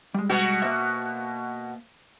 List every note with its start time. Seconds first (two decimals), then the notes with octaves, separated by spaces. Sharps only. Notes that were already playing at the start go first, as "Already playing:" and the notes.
0.14 G3 G#3
0.29 B2 F#4
0.62 A#3 C5 E5